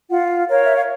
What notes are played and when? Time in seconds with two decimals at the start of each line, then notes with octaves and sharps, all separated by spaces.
0.09 F4 F#5
0.49 A#4 C#5 F5
0.63 E5
0.74 F5